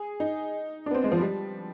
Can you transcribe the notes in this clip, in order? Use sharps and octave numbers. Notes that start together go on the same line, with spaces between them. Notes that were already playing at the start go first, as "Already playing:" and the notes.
Already playing: G#4
D#4
D4
B3
C4
G#3
F3
G3